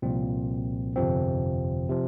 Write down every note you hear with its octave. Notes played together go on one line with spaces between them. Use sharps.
C2 A#2 F3 C4
G1 F2 C3 F3 C4
C3 F3